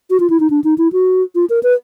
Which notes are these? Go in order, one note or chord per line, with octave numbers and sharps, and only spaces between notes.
F#4
F4
E4
D#4
D4
D#4
E4
F#4
F4
A#4
B4